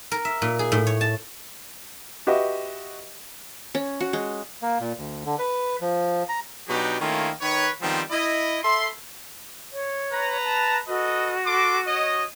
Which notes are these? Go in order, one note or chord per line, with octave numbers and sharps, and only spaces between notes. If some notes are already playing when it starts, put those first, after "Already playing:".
A#4
E5
A#2
G#4
A2
C#5
A5
F#4 G4 B4 D#5 E5
C#4
F#4
G#3
A#3
A#2
D2
D3
B4
F3
A#5
B2 F#3 D4 D#4 F#4 G4
D#3 A3 A#3 C#4 E4 F4
D#3 B4 C#5
D#3 F3 G3 G#3 B3 C4
E4 D#5
A4 E5 B5 C6
C#5
B4 A#5
A5
F#4 A4 B4 D#5
A4 C6 D6
C#5 D#5